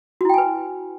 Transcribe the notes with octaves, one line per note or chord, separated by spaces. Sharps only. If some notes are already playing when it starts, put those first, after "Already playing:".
E4 F#4 B4 G5 G#5